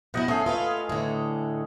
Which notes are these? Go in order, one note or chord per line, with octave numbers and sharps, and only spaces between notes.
B2 F#3 E4 D#5 F#5 G5
A3 C#4 G#4
F4 B4 F5
A2 D3